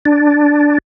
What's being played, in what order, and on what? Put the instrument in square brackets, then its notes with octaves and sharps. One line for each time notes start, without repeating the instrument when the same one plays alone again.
[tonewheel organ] D4